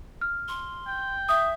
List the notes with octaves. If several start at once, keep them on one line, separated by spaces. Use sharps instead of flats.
F6
C6
G5
E5 D#6